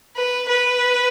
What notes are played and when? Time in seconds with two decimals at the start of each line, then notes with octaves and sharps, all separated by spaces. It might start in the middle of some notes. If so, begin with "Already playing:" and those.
0.16 B4
0.48 B4